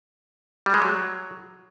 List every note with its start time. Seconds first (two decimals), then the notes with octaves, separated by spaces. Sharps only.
0.66 G3
0.74 G#3
0.82 F#3